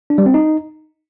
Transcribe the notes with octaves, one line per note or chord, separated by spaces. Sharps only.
D4
G3
C4
D#4